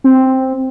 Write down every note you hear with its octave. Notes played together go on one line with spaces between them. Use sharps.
C4